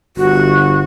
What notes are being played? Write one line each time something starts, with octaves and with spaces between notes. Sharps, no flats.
G1 F#4